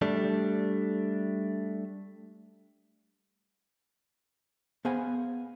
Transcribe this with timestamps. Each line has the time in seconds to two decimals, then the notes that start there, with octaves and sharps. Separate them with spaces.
0.02 G3 A3 D4
4.85 B3 G#4 C5 F5 F#5 G#5